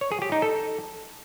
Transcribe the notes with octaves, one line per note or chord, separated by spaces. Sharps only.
C#5
G#4
G4
D#4
A4